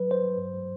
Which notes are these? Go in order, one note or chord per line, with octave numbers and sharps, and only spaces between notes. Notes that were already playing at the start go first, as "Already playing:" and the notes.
Already playing: F#3 B4
F#3 C5
G2